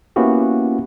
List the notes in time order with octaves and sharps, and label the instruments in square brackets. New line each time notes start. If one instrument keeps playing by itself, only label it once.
[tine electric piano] A#3 B3 C#4 E4 F#4 G4